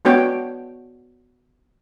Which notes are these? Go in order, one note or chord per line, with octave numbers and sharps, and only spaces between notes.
G#3 B3 D4 F#4 C#5 G5